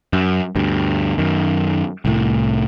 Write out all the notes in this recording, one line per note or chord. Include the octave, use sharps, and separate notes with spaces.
F#2
D2 G2
F#2 D#3
C2 A2